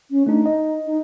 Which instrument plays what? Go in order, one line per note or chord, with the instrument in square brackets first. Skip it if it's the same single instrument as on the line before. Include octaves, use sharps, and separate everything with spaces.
[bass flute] C#4
[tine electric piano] A3 D4 [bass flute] D#4
[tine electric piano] D#5
[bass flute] D#4